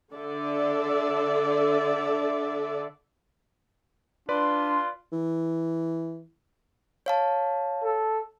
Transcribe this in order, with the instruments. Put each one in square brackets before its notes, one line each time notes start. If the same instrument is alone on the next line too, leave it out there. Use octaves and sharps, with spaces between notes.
[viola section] D3 A4 D5 E5
[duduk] D4 [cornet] F4 [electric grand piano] B4 D5 [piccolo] C6
[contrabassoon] E3
[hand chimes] C#5 F5 A5
[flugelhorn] A4